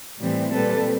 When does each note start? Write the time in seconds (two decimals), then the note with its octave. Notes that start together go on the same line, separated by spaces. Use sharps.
0.18 A2 E3 G3 C4
0.53 A#2 G3 C4 A4 B4